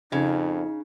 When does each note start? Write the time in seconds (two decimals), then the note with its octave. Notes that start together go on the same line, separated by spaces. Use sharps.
0.12 F2 C#3 D#4